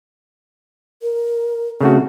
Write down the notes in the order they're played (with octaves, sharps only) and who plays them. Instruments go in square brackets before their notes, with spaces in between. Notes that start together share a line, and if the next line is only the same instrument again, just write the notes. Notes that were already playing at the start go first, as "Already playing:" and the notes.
[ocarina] A#4
[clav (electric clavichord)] C#3 A3 F#4 [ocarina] C4